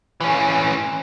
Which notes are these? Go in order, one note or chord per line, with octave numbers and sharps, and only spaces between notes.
E3 C#4